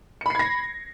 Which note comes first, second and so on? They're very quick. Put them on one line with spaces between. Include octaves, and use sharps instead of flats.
C#7 B5 C7 G#6 A#6